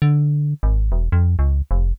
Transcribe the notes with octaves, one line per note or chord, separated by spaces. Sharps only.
D3
G#1
E1
F2
C#2
F1